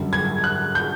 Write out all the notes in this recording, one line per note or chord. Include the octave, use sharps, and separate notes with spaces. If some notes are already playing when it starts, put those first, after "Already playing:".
Already playing: F#2 D3 G3
G#6
F#6
G6